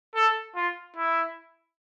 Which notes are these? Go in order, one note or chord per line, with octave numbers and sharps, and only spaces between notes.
A4
F4
E4